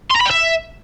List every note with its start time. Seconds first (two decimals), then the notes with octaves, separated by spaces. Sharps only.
0.10 C6
0.15 A#5
0.21 B5
0.26 G5
0.31 E5